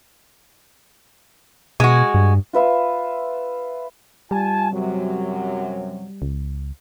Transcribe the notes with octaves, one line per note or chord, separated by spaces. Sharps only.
B2 G#3 F#4
G2
F4 B4 E5 F5
G3 F4 G#5 A5
F#2 C3 F#3
C#2